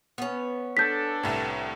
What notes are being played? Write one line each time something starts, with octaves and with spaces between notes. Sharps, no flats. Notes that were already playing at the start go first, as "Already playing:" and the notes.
B3 C#4
D4 A4 G6 B6
C2 A2